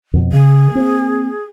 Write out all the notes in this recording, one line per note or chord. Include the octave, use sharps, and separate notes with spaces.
F2 B2
C#3 G#4
A#3 C4